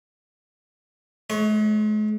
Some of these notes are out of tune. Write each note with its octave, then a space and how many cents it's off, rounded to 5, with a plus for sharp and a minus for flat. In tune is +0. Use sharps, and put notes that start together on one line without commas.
G#3 +45 C#5 +0